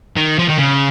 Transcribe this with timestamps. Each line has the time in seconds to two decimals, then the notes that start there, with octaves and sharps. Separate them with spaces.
0.17 D#3
0.39 F3
0.49 D#3
0.58 C#3